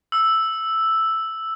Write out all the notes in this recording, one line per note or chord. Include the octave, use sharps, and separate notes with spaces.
E6